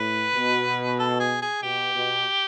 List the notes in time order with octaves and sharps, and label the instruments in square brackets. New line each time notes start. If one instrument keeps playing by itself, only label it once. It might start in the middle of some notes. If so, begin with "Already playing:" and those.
Already playing: [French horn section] A2 [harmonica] B4
[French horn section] B2
[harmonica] A4
G#4
G#4
[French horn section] B2 [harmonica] G4
[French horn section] B2